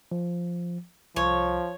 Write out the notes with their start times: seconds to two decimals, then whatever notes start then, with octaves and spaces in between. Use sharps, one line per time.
0.12 F3
1.16 C2 F3 C#5